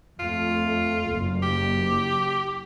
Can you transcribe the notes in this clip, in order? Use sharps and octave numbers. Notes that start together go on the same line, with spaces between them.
F2 A3 F4
F#1 A#3
G4